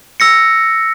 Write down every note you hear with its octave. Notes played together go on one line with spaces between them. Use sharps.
E6 A#6 C#7